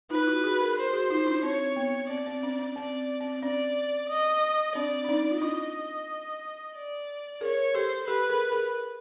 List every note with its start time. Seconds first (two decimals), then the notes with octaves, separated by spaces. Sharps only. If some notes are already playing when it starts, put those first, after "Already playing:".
0.10 D#4 F4 B4
0.27 E4 F#4
0.44 F#4 G#4
0.60 G#4 A#4
0.77 C5
0.93 F#4 G#4
1.10 D#4 F4
1.27 D4 E4
1.43 C4 C#5
1.76 B3
2.09 C4 D5
2.27 C4
2.43 C#4
2.59 C#4
2.76 C4 D5
3.21 C4
3.43 C#4 D5
4.09 D#5
4.75 C4 D4 D5
5.04 D4
5.09 C#4 D#4
5.31 F4
5.41 D4 E4 D#5
6.75 D5
7.41 G#4 A#4 C#5
7.74 G4 A4 C5
8.07 G4 A4 B4
8.29 G#4 A#4
8.52 G#4 A#4